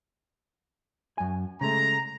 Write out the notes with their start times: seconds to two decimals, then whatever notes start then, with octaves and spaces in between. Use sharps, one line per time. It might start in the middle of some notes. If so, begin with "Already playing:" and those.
1.18 F#2 G#5
1.61 C#3 G#3 A3 A#5